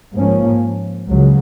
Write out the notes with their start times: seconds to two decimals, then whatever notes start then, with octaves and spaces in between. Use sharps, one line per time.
0.14 G#2 F3 A#3 C#4
1.07 C#2 C#3 F#3